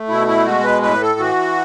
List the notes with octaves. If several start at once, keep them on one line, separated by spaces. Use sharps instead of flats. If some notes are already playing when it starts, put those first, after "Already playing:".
Already playing: A3
B2 E4
E4
G#3 F#4
B4
A2 B4
A4
E3 F#4